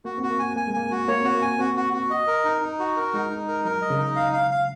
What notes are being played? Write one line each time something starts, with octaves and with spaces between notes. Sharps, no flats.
A#3 F#4
C4 F#4
A#3
G#5
A#3 G#5
G#3
A#3 G#5
F#4
A#3 C#5
C4 F#4
A#3
G#5
C4 F#4
F#4
F#4
D#5
A#4
D#4
D#4
F#4
A#4
G#3 D#4
D#4
A#4
F#3 A#4
D#5
C#3
D#4
F5
F5
F5